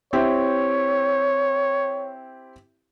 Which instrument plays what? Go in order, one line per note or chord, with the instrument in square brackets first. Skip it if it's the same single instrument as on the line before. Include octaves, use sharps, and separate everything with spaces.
[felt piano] C4 E4 G4 [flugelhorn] C#5